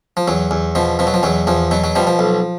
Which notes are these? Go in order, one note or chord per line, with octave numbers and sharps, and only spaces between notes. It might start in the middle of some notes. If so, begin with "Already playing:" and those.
F3
E2 F#3
E2
B2 F3
B2 F3
F#3
F3
E2 F#3
E2 F3
B2 F#3
F#3
B2 F3 G3
F3
B1